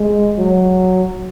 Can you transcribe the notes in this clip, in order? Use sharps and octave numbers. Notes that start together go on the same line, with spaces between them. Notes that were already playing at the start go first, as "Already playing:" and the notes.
Already playing: G#3
F#3